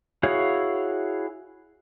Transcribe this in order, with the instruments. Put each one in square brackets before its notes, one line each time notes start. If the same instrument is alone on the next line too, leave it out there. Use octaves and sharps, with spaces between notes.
[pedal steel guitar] E4 F#4 G#4 C#5 F5